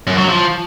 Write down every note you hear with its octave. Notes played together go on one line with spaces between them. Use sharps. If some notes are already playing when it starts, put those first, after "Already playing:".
F#2
F#3
F3